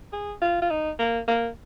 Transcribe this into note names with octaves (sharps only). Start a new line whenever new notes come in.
G#4
F4
F4
D#4
A#3
A#3